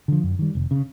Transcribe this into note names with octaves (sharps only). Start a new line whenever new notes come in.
D3 F3
F#2
D#3 G3
F1
C#3